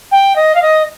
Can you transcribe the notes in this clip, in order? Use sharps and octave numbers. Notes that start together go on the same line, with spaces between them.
G5
D#5
F5
D#5